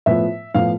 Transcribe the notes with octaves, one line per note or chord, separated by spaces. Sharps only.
A2 F3 B3 E5
A2 F3 B3 F5